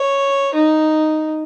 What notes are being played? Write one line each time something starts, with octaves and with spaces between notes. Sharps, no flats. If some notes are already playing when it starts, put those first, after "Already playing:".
Already playing: C#5
D#4